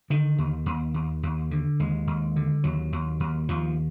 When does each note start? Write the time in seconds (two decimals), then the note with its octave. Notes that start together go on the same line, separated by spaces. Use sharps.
0.10 D3 D#3
0.38 D#2
0.66 D#2
0.94 D#2
1.23 D#2
1.51 D3
1.80 D#2 G#3
2.07 D#2
2.36 D3
2.64 D#2 F#3
2.92 D#2
3.20 D#2
3.49 D#2 F3